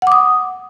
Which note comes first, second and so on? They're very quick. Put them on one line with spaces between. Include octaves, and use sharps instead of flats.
F#5 D6 D#6